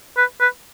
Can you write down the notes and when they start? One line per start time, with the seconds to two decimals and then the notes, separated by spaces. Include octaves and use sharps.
0.17 B4
0.40 B4